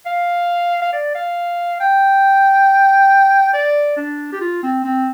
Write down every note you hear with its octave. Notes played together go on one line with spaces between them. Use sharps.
F5
F5
D5
F5
G5
D5
D4
G4
F4
C4
C4